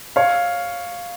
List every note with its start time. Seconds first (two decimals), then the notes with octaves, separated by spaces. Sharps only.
0.16 C#5 F5